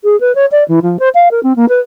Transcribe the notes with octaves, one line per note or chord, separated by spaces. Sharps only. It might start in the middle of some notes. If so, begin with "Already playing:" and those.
G#4
B4
C#5
D5
E3
F3
C5
F5
A#4
C4
A#3
B4